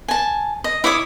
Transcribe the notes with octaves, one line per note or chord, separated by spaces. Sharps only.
G#5 A5
D#5
E4 C#5 D6 D#6